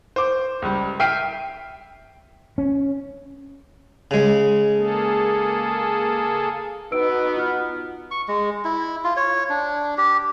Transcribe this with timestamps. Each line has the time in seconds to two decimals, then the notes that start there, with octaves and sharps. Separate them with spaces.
0.16 C5 D6
0.62 C#2 G3
1.00 E5 G5 F6 C7 D#7
2.58 C#4
4.11 C#3 G#3
4.75 A#3 G#4 A4
6.92 B3 D#4 F#4 B4 E6 D7
7.37 F4 F6
8.11 C#6
8.28 G#3
8.64 E4
9.04 F4
9.17 C#5
9.50 D4
9.98 G4